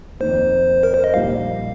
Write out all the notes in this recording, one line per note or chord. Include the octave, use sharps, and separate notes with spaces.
F2 D#3 A#3 C5
A#4
C5
D#5
A#1 A#2 G3 D#4 F5